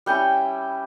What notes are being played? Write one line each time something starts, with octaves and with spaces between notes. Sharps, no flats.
G3 C#4 E4 G5